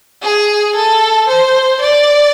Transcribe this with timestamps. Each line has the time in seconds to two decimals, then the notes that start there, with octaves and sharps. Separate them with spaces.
0.22 G#4
0.76 A4
1.28 C5
1.81 D5